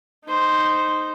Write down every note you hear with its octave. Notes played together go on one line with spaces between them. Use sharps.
D#4 C5